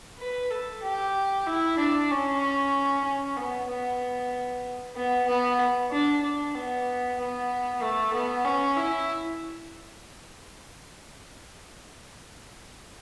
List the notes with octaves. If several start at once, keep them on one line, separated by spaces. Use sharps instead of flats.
B4
A4
G4
E4
D4
C#4
C#4
B3
B3
B3
B3
D4
D4
B3
B3
A3
B3
C#4
E4